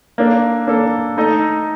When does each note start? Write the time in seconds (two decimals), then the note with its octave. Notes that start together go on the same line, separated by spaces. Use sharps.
0.18 A#3 D4 A4
0.67 A#3 D4 A4
1.17 A3 D#4 A4 D#5